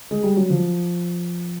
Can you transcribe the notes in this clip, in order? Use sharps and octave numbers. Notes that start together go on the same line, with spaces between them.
G#3
G3
F#3
F3